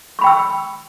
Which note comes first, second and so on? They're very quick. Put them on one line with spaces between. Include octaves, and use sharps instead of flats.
C#6 B5 G5 E6